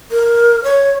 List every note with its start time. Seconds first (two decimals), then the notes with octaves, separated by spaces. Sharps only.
0.11 A#4
0.64 C#5